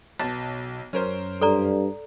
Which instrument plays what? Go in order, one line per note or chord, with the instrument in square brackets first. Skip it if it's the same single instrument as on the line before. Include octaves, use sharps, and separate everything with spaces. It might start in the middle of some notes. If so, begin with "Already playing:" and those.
[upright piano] B1 [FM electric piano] B2 A5
[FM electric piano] F#2 [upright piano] C#4 A#4 C5
[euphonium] G2 [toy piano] A4 D5 A#5